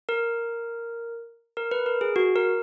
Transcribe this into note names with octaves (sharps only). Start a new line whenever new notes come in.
A#4
A#4
B4
A#4
G#4
F#4
A#4